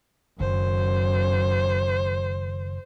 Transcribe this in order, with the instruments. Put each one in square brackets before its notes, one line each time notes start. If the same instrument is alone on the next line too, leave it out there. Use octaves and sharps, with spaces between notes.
[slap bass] F#1 D#3 [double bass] F#2 [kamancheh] C5